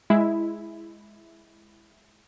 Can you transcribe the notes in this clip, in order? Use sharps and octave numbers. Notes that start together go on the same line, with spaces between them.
G#3 E4